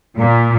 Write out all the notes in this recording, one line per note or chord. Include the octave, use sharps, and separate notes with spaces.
A#2